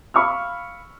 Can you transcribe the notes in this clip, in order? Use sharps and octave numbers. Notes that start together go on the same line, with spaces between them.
F5 B5 C#6 E6 F6